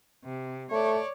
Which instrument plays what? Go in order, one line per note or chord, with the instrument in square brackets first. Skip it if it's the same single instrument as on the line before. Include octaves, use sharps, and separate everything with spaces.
[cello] C3
[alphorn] A3 [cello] C#5 D5